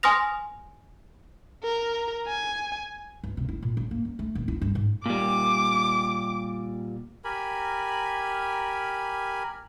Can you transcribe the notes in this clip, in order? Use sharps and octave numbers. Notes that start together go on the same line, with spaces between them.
G#5 C6 D#6 F6 A#6 F7
A#4
G#5
G1
C3
E4
A#2
A1
A#3
F#2
A3
D#1
E4
G2
G#2
A#2 G3 D6
G4 A#4 G#5 B5